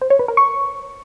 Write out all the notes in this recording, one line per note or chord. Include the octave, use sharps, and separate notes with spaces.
C5
C#5
B4
A#4
C#6